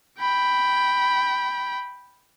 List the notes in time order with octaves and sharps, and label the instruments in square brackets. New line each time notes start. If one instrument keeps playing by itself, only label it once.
[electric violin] G5 B5